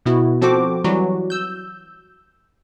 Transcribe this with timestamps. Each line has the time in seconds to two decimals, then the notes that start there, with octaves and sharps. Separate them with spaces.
0.05 B2 B3 E4 F#4
0.42 F3 C4 F#4 A4 C5 D6
0.84 E3 F#3 G3 F#4
1.30 E6 G6